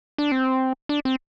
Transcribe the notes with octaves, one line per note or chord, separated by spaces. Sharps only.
D4
C4
D4
C4